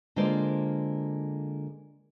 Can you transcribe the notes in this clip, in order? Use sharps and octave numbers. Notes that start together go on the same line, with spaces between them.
D3 G#3 A#3 F4 C5 D5